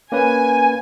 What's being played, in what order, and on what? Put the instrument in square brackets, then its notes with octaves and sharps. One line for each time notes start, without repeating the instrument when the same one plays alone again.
[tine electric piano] A#3 C#4 B4 [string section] G#5